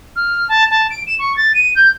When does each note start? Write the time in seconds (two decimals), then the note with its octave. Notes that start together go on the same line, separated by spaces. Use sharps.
0.16 F6
0.49 A5
0.70 A5
0.90 D7
1.07 E7
1.19 C#6
1.36 A6
1.54 D#7
1.75 G6